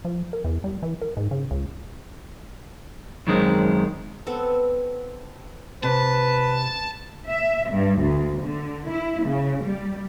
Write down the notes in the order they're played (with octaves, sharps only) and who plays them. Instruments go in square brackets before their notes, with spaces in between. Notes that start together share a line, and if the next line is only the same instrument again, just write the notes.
[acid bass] F3
A#4
E2
G3
E3
A#4
G#2
C#3
C#2
[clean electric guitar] F#2 D#3 G#3 C4
[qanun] B3 C4 A4
[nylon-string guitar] C3 [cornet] B4 [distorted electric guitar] A5
[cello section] E5
G2
D2
D3
E4
C#3
G3